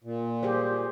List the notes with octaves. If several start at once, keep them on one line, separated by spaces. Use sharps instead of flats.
A#2
G4 G#4 C5